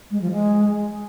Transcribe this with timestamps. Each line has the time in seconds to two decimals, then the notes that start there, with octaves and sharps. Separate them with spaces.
0.11 G#3
0.22 F3
0.32 G#3